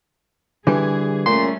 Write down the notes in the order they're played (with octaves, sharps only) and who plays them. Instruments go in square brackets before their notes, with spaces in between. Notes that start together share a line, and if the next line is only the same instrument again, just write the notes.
[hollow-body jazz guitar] D3 G3 [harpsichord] E3 [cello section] G#4
[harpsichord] A#2 [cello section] G3 A3 C#4 [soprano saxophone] C6